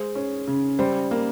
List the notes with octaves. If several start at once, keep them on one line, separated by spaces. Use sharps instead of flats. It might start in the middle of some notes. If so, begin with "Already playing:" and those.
Already playing: G#3 C5
C#4
C#3
G3 C5
A#3